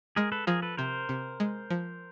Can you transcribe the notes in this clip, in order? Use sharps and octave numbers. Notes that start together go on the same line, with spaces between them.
G#3 G#4 A#4
A4 B4
F3 G#4 A#4
A4 B4
C3 A#4 C5
C3
G#3
F3